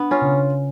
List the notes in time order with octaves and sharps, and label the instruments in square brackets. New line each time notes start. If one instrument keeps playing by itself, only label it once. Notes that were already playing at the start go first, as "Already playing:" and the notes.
Already playing: [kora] B3 [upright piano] D4
[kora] C#4 F4
[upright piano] C#3